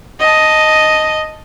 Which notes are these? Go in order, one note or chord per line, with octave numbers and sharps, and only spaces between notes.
D#5 A5